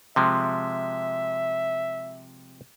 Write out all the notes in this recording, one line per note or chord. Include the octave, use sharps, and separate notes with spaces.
C3 F3 G#3 E5